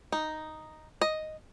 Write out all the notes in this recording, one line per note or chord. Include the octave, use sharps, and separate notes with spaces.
D#4
D#5